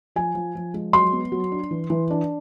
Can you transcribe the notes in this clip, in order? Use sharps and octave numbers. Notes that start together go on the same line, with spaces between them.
F3 G#5
F3
F3
G#3
F#3 C6
B3
F#3
D4
E3
E3
D4